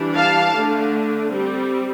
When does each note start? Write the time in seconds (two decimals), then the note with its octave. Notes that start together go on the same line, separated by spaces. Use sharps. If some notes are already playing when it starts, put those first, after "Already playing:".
Already playing: E3 G3 D4
0.17 F5 A5
0.54 D3 A3 D4
1.29 G3 C4